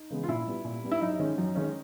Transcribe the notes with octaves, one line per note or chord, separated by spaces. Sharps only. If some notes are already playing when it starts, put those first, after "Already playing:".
Already playing: D#4
C#3 E3 G#3 B3
F4
A#2 E4
G3 B3
A#2
G3 B3
E4
F#2 D#4
D#3 G#3 C#4
F#2
D#3 G#3 C#4